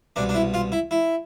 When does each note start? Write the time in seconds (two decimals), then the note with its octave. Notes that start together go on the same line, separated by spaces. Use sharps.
0.16 C2 B2 D4
0.29 D4
0.34 E4
0.54 F4
0.72 E4
0.91 E4